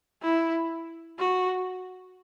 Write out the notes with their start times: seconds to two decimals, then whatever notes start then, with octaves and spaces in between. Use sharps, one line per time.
0.22 E4
1.19 F#4